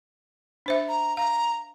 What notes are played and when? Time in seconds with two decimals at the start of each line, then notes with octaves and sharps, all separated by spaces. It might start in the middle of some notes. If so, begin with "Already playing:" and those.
0.66 D4 C5 E5
0.88 A#5
1.17 F5 A#5